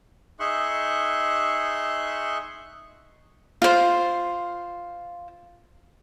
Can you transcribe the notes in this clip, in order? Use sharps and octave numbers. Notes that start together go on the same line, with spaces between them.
D#4 G#4 E5 C6 C#6 F#6
F4 C5